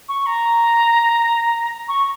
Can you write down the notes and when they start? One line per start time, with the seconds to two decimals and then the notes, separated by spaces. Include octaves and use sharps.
0.09 C#6
0.26 A#5
1.88 C#6